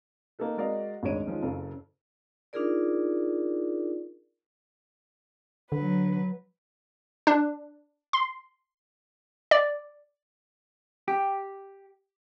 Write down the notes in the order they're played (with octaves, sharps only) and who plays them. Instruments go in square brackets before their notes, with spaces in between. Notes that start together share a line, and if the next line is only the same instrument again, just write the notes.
[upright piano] A#3 D#4 A4 B4
G#3 F#4 A#4 D5 D#5 F5
G#1 D2 G#3 C#5 D7 D#7
D#3 F3 G#3 C#4
F#1 F#2 A4 F5
[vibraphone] D4 D#4 F4 G#4 A#4 D5
[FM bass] D3 [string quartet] F#3 B4
[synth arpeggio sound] D4
C6
D5
[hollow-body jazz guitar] G4